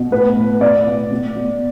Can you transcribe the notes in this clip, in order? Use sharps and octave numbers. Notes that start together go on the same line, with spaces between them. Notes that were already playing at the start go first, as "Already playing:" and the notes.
Already playing: B2
A2 B4
A2
B2 D5
B2
B2
B2